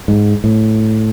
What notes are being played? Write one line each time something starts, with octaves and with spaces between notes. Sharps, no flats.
G#2
A2